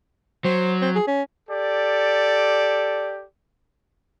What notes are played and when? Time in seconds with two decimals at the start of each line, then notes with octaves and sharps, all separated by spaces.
0.44 F#3 C5
0.82 C4
0.95 G#4
1.07 C#4
1.49 G4 A4 D5